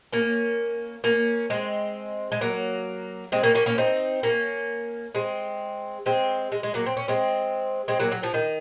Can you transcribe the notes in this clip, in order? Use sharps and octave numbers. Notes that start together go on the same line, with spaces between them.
A#3 C#4
A#3 C#4
G#3 C4
G#3
F#3 A#3
G#3 C4
A#3 C#4
A#3 C#4
A#3 C#4
C4 D#4
A#3 C#4
G#3 C4
G#3 C4
G#3
G#3
F#3 A#3
C4
C#4
G#3 C4
G#3 C4
F#3 A#3
F#3
F3
D#3